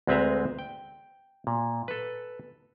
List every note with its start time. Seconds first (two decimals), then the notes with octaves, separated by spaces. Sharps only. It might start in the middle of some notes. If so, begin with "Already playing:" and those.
0.07 D2 G#3 C4 B4 E5 A#5
0.59 G5
1.47 A#2
1.88 A4 B4